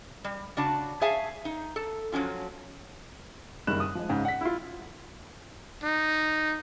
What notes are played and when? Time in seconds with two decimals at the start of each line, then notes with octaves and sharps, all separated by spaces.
0.24 G3
0.57 C#3 D4 F#4 A5
1.01 G#4 C#5 E5 F5 G#5 A5
1.45 D#4
1.76 A4
2.12 F3 F#3 C#4 F4
3.67 F#1 D#3 G3 B5 F#6 E7
3.80 D#6
3.95 F3 G#3
4.09 C#2 G#2 C#3
4.25 F#5 B6
4.41 E4 F4
5.84 D#4